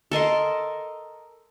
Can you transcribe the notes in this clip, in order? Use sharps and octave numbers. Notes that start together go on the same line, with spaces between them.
A4 A#4 D#5 C6